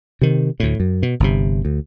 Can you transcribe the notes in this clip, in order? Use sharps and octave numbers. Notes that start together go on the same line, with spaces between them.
C3 D#3
D2 A2
F#2
B2
G1 C3
D2